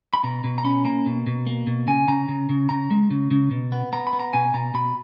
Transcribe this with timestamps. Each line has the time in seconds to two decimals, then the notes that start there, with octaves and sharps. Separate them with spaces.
0.14 B5
0.23 B2 A#5
0.44 B2
0.58 A#5
0.64 C#4 B5
0.85 A#3 A#5
1.06 B2
1.26 B2
1.47 A#3
1.67 B2
1.87 C#3 G#5
2.08 C#3 A#5
2.28 C#3
2.49 C#3
2.69 C#3 A#5
2.91 G#3
3.11 C#3
3.31 C#3
3.51 B2
3.72 B3
3.93 B3 A#5
4.07 B5
4.13 B3
4.19 A#5
4.33 B2 G#5
4.54 B2 A#5
4.74 B2 B5